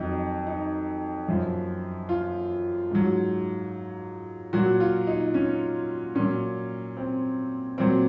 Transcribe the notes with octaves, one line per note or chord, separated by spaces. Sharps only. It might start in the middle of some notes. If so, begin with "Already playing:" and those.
Already playing: F2 D#3 F#3 D#4
D#4
F#2 F3
F4
G#2 F#3
A#2 F#3 F#4
F4
D#4
C#4
A#2 F#3 C#4
C4
A#2 F#3 C4